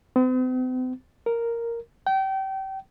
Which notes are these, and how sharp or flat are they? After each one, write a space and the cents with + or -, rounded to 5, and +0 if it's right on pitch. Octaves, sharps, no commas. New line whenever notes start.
C4 -45
A#4 -5
G5 -30